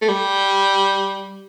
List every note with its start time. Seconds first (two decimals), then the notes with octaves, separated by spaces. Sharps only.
0.01 A3
0.08 G3